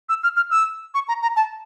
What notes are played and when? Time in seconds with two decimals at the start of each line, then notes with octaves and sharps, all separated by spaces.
0.09 E6
0.23 F6
0.37 F6
0.51 E6
0.94 C#6
1.08 A#5
1.22 A#5
1.36 A5